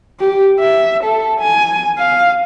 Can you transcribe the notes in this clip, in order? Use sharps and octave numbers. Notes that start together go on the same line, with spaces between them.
G4
E5
A4
G#5
F5